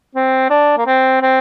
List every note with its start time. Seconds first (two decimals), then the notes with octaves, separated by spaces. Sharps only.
0.15 C4
0.50 D4
0.77 A#3
0.86 C4
1.22 C4